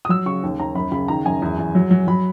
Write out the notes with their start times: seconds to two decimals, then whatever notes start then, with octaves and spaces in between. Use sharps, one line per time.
0.05 D#6
0.09 F#3 E6
0.26 C#3 C#6
0.43 D#2
0.59 D#2 A#5
0.75 F#2 B5
0.92 C#3 B5
1.08 D#3 A#5
1.25 F#2 G#5
1.42 E2
1.58 E2
1.75 F#3
1.91 F#3
2.07 F#3 B5